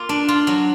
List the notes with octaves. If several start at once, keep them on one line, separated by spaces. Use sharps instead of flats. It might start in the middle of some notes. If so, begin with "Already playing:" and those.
Already playing: A#3 F4
D4
F4
F#3